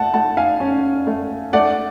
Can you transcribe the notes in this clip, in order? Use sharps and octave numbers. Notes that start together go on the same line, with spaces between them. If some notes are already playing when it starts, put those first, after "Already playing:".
Already playing: A3 F#5 A5
A3 F#5 A5
F5 G#5
C#4
A3
A3 D5 F#5